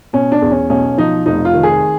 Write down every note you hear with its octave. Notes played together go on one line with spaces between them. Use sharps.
B2 C#4
D4
E2
C#4
B1 C#4
F3 D#4
F1 D#4
F4
D#3
G#4